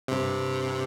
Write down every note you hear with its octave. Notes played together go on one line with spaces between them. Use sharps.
G2 C3